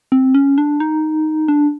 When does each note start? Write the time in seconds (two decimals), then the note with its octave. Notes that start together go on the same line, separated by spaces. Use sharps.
0.12 C4
0.34 C#4
0.58 D4
0.80 D#4
1.48 D4